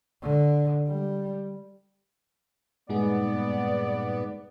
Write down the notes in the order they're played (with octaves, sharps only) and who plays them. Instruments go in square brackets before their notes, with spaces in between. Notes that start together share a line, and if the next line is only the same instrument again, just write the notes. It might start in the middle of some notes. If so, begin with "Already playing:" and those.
[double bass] D3
G3
[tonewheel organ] G2 A#2 [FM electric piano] G#3 D#4 G#4 [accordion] B3 [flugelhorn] D5